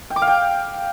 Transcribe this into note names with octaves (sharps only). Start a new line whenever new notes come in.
G5
D6
F5
G5